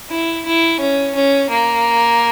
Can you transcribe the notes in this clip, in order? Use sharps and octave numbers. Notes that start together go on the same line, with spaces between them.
E4
E4
C#4
C#4
A#3